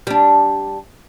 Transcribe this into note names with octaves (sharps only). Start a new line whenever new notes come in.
G3 D4